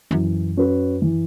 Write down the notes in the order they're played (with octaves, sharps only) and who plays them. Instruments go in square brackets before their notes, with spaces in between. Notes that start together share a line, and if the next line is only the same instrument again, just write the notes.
[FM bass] F#2 [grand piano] E3
[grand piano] C#4 F#4 B4
E3